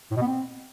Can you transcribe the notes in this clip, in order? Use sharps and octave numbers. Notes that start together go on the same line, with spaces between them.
A2
B2
B3
C4